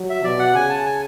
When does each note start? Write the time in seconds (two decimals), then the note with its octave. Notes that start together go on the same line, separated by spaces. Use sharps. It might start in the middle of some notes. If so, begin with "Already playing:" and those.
Already playing: F#3
0.09 E5
0.24 B2 D5
0.39 F#5
0.55 C#3 G#5
0.69 A5
0.85 G#5